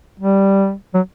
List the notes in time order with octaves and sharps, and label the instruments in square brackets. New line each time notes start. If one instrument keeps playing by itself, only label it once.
[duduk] G3
F#3